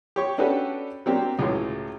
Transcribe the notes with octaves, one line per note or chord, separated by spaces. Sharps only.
G4 C#5 C#6
C#4 D4 F#4 G4 A4 B4
F#3 A#3 C4 D4 G4
C#2 A2 F#3 G#3